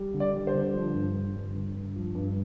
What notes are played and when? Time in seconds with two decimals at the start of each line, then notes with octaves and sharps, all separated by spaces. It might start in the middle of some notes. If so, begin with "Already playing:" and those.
Already playing: G3
0.13 D3
0.20 D5
0.34 G3
0.47 C5
0.54 D3
0.74 F3
0.93 G2
1.14 D3
1.35 G2
1.55 D3
1.75 G2
1.96 F3
2.15 G2